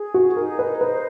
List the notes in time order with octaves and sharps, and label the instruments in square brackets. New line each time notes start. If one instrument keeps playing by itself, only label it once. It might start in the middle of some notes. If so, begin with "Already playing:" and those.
Already playing: [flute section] G#4
[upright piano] F#4
[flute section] D#4 [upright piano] A#4
[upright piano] B4
[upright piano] B4 [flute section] C5